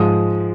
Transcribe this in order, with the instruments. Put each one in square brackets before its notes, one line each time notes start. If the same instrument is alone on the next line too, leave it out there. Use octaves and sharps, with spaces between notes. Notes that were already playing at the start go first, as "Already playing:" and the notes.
Already playing: [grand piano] G#2 F3 G#3 D#6